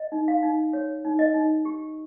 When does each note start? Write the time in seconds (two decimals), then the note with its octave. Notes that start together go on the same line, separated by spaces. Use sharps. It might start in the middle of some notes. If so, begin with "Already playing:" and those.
Already playing: D#5
0.12 D#4
0.28 F5
0.43 D#4
0.73 C#5
1.05 D#4
1.19 D#5
1.34 D#4
1.65 G4